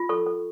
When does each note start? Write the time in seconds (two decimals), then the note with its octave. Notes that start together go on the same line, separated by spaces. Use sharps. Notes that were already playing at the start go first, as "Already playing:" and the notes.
Already playing: F4
0.09 A4 C#6
0.26 A4